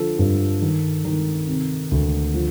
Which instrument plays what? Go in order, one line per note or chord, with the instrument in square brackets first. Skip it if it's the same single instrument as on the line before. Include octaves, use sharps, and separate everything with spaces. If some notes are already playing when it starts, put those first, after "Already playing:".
Already playing: [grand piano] D3 F3 A4
G2
D#3
D#3
C3
D2
F3